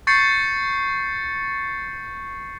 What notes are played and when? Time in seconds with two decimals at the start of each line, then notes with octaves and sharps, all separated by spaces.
0.07 C#6 G6 A6 C7 C#7